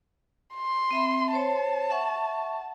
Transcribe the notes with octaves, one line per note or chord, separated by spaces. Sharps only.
C6
C4 E5 B5
C5 C#5 A5
E5 F#5 C#6